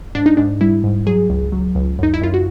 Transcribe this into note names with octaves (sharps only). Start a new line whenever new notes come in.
G#2 D4
D#4
G#2 D4
G3 E4
G#2
F#3 G#4
C#2
F#3
C#2
F#2 D#4
E4
F#2 F4
F#4